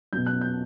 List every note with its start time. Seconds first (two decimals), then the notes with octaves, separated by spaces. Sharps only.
0.13 B2 F#3 G6
0.26 F#6
0.41 G6